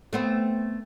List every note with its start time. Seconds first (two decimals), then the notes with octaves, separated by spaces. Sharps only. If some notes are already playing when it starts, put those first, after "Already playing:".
0.13 A3 B3 C4